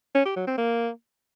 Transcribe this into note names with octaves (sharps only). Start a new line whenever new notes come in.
C#4
G4
F#3
C4
A#3